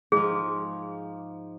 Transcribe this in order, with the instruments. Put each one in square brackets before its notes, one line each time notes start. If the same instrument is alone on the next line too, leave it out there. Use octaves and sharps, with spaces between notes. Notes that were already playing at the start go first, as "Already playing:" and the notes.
[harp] G#2 F3 [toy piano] G#4